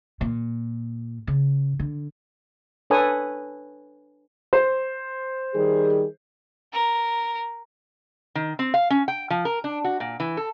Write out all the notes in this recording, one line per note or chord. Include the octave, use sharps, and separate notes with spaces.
A#2
C#3
D3
D4 A4 B4 C#5 G#5 D#6
C5
D#3 G3 G#4
A#4
D#3
C4
F5
C#4
G5
F3
A#4
D4
F#4
A#2
E3
A4